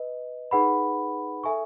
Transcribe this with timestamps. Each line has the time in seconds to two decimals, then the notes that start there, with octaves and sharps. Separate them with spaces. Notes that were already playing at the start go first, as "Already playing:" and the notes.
Already playing: B4 D#5
0.51 D#4 G#4 B4 F#5 B5
1.44 A4 E5 G#5 C#6